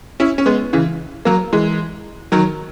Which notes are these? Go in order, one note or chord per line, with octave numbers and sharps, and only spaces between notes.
C#4 E4
C#4
G#3 B3
C#3 E3
F#3 A#3
E3 G#3
D#3 F#3